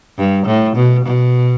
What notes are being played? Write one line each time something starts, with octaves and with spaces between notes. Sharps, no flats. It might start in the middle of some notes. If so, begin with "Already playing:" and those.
G2
A2
B2
B2